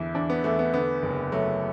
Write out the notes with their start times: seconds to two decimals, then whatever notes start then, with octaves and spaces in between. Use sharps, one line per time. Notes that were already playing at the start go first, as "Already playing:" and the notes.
Already playing: E2 D3 E4
0.14 E2 D4
0.30 B3
0.44 E2 A3
0.59 B3
0.74 D3 B3
1.03 F#1
1.32 F#3 A3